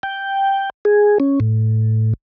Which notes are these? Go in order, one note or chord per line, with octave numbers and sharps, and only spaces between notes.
G5
G#4
C#4
A2